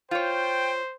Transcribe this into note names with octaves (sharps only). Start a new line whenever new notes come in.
F4 C5 C#5 G5